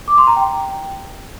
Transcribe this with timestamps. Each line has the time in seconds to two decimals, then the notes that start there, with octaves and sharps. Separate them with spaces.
0.08 D6
0.18 C6
0.27 A#5
0.36 G5